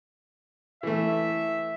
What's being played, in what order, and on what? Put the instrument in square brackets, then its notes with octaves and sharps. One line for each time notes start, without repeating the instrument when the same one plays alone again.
[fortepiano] E3 A3 [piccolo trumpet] E5